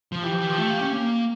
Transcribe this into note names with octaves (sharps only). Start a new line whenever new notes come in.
F3
E3 G4
F3
E3
F3
A3
A#3
C#4
A#3